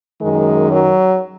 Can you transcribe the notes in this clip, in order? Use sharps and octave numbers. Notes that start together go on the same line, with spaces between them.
F#2 D#3 G#3
F#3